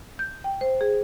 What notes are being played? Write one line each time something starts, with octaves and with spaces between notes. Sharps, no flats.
G6
G5
C5
G#4